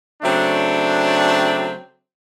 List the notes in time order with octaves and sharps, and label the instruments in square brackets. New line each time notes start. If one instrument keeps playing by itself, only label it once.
[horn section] C#3 F#3 A3 C4 D4